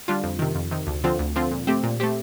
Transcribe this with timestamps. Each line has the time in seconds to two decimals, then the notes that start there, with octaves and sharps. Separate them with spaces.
0.08 D3 G3 D4 F4
0.24 F2
0.39 C3 D#3
0.55 F2
0.71 C3 D#3
0.87 D2
1.04 D3 F3 C4 F4
1.19 D2
1.36 D3 F3 C4 F4
1.51 A#2
1.67 A3 C4 G4
1.83 A#2
2.00 A3 C4 G4